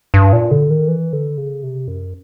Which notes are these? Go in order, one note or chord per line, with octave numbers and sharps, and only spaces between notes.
G2
A#2
D3
D#3
E3
D3
C#3
C3
F#2